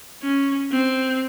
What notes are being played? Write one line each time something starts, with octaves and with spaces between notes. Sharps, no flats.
C#4
C4